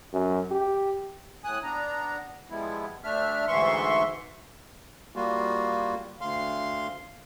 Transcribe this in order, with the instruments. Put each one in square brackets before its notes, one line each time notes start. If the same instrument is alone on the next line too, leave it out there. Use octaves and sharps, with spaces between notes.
[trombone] F#2
G4
[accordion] A2 G#5 D#6 F#6
B3 D4 A#5
F3 G3 G#3 B3 E4
D2 A3 D4 E5 F6
D2 G#2 E3 E5 C6 C#6
[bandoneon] G3 A#3 F4 F#4
D2 F5 C6